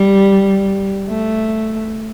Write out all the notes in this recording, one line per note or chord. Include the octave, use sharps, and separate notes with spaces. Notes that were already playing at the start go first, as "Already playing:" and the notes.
Already playing: G3
A3